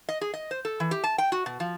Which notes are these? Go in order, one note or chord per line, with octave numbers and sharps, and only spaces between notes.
D#5
G#4
D#5
C5
A4
E3
G4
A5
G5
F#4
B2
F3